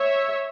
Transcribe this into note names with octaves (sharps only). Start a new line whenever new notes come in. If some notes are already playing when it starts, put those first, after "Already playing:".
Already playing: C#5 E5